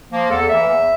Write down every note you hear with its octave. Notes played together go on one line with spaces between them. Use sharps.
F3 A#3
E2 A4
E3 A#3 E5
E2